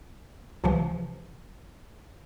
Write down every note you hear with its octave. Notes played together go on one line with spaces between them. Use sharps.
C#2 C3 E3 F3